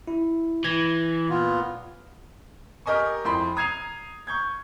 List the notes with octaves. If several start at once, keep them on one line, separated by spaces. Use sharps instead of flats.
E4
E3 G#6 A#6
A#2 B3 F4
G4 A#4 D#5 G#5 C#6
F2 E4 G5 B5 C6
A#5 D#6 G#6 C7 D#7 F7
C#6 G6 G#6